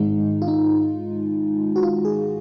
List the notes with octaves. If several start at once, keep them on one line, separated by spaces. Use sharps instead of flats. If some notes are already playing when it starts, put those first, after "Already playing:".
Already playing: G#2 D#3 G#3 D#4
F4
D#4
F#4
F4
G#4